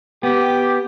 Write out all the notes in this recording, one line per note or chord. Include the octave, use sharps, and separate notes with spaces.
B3 G4